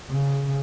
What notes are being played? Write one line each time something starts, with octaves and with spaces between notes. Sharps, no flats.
C#3